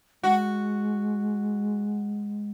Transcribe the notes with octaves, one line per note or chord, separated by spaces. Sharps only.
G#3 F#4